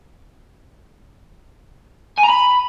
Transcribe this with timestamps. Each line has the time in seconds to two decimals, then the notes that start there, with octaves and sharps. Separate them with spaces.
2.18 G#5
2.23 A#5
2.29 B5